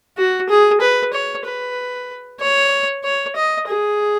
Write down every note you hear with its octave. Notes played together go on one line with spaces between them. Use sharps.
F#4
G#4
B4
C#5
B4
C#5
C#5
D#5
G#4